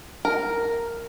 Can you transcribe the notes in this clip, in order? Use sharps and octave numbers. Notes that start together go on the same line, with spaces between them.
A#4